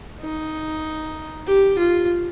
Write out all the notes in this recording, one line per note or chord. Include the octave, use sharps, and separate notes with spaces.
D#4
G4
F4